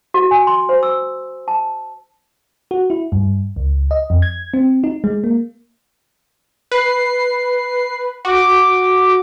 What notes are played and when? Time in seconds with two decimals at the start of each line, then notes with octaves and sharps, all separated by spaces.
0.14 F#4
0.31 G#5
0.47 C6
0.69 C5
0.83 E6
1.48 A5
2.71 F#4
2.90 E4
3.12 G2
3.56 C#2
3.91 D#5
4.10 F2
4.22 G#6
4.54 C4
4.84 D#4
5.04 G#3
5.24 A#3
6.71 B4 C7
8.25 F#4 D6